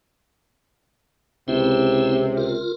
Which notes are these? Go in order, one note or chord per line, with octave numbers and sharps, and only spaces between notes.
C#2 C3 C4 E4
F4 A#4